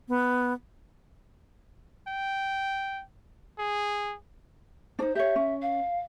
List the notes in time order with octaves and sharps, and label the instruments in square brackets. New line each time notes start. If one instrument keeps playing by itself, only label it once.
[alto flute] B3
[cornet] G5
G#4
[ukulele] D4 D#4 [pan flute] C5
[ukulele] G4 C#5 [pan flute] E5
[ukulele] C#4
[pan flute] F5